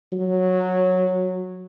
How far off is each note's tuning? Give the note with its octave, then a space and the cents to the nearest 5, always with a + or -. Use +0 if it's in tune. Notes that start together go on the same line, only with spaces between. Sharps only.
F#3 -10